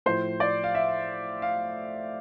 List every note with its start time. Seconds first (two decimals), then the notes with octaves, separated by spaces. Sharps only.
0.06 A2 F3 C5
0.40 D5
0.64 F5
0.75 E5
1.42 F5